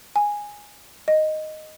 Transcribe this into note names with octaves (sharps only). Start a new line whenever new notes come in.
G#5
D#5